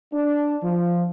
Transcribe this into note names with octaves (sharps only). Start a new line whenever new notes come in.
D4
F3